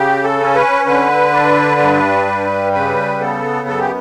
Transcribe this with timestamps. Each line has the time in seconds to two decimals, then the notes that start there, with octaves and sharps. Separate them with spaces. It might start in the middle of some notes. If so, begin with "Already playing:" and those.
Already playing: C#3 G4
0.23 A4
0.40 C#4
0.55 B4
0.86 D3 B4
1.32 D4
1.80 G2
2.27 G3
2.73 C#3 B4
3.20 B3 A4
3.67 F#2 A4
3.79 G4